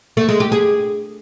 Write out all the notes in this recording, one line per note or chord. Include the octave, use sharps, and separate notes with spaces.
A3
G#3
G4
G#4